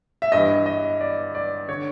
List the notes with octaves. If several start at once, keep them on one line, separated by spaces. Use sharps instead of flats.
E5
G2 E3 D#5
D#5
D5
D5
D3 C#5